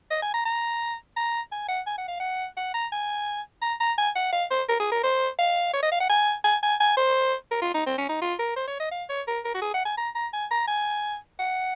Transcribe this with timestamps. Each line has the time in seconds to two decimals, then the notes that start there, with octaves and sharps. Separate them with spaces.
0.10 D#5
0.22 G#5
0.34 A#5
0.45 A#5
1.16 A#5
1.51 G#5
1.68 F#5
1.87 G#5
1.98 F#5
2.08 F5
2.20 F#5
2.57 F#5
2.74 A#5
2.92 G#5
3.62 A#5
3.80 A#5
3.98 G#5
4.16 F#5
4.32 F5
4.51 C5
4.69 A#4
4.80 G#4
4.92 A#4
5.03 C5
5.39 F5
5.73 C#5
5.83 D#5
5.92 F5
6.00 F#5
6.09 G#5
6.44 G#5
6.63 G#5
6.80 G#5
6.97 C5
7.51 A#4
7.62 F4
7.74 D#4
7.86 C4
7.98 C#4
8.09 D#4
8.22 F4
8.39 A#4
8.56 C5
8.68 C#5
8.80 D#5
8.92 F5
9.09 C#5
9.27 A#4
9.45 A#4
9.55 F#4
9.62 G#4
9.74 F#5
9.85 G#5
9.97 A#5
10.15 A#5
10.33 G#5
10.51 A#5
10.68 G#5
11.39 F#5